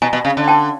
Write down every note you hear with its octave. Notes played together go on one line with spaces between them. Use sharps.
B2 G#5 A#5
B2
C#3
D3
G5 A5